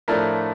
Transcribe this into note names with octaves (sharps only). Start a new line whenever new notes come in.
A2 F3 A3 D4 A#4